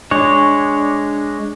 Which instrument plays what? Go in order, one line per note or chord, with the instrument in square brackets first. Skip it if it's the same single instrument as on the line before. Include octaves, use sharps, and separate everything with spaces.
[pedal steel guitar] G#3 D4 C#5